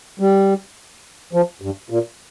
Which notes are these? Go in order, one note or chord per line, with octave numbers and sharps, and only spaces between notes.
G3
F3
G2
A#2